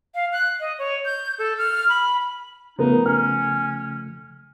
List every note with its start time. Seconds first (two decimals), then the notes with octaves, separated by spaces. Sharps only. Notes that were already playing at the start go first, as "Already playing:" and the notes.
0.15 F5
0.33 F#6
0.60 D#5
0.79 C#5
1.05 G6
1.39 A4
1.58 F6
1.89 B5
2.79 C#3 F3 A3 B3 D#4 A#4
3.06 C#4 F6